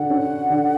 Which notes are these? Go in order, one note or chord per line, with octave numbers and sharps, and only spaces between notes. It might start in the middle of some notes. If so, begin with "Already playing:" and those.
Already playing: D3 F#5
C#4
D3